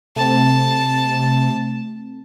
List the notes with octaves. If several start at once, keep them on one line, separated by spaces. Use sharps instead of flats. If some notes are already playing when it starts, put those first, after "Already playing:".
C3 A3 C4 A5